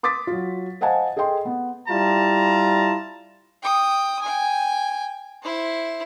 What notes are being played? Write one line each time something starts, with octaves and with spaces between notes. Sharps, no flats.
C6 D6 D#6 A6 B6
F#3 F4
C5 D#5 F5 F#5 G#5 A5
G#4 A4 D#5 G5 C6
B3
G3 E4 F4 A5 A#5
G5 D#6
G5 G#5
E4 C5